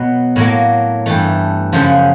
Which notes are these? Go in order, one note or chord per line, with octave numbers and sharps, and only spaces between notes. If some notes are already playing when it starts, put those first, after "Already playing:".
Already playing: B2 F#3 B3
A2 F#3 A#3
G2 E3 A3
F#2 C#3 F3